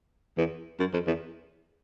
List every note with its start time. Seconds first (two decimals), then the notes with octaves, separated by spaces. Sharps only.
0.38 E2
0.80 F#2
0.93 F2
1.07 E2